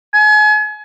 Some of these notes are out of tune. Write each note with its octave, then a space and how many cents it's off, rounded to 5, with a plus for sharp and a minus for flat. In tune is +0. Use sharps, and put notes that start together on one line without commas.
G#5 +35